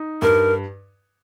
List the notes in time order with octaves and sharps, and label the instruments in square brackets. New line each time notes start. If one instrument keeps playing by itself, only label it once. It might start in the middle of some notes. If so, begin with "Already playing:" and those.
Already playing: [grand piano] D#4
[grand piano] G2 [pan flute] A#4